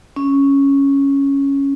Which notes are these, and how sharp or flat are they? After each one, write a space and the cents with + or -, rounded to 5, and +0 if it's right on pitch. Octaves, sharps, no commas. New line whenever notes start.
C#4 +0